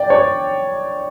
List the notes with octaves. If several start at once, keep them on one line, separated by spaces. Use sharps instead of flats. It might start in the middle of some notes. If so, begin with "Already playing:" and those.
Already playing: D5 G5
C#5